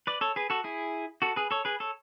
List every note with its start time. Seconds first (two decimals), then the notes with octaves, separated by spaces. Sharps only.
0.07 B4 D5
0.21 A4 C#5
0.36 G#4 B4
0.50 F#4 A4
0.64 E4 G#4
1.22 F#4 A4
1.36 G#4 B4
1.51 A4 C#5
1.65 G#4 B4
1.80 A4 C#5